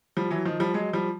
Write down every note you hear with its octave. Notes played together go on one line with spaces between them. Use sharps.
F3 G3
E3 F#3
D#3 F3
F3 G3
F#3 G#3
F3 G3